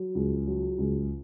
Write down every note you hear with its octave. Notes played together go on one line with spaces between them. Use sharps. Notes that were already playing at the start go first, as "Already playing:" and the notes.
Already playing: F#3
C#2
F#3
C#2